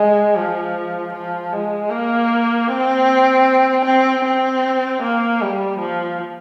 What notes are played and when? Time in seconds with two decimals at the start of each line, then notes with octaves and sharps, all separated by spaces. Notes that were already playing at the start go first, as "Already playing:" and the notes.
Already playing: G#3
0.36 F3
1.14 F3
1.52 G#3
1.90 A#3
2.69 C4
3.85 C4
4.25 C4
5.02 A#3
5.41 G3
5.79 F3